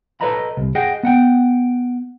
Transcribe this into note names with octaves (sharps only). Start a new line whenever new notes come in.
A4 B4 C#5 D#5 A#5 B5
C2
G#4 D#5 F#5 G5
B3 F#5 G5